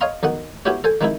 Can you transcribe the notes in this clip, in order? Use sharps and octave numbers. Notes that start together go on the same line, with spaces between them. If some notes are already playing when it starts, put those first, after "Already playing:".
C#5 D#5 F5 A#5 C6
B1 D#3 D#5 F#5
B3 C#4 E4 F#4 G4 C#5
A4 C5 G#5
D#3 G#3 C4 D#4 E4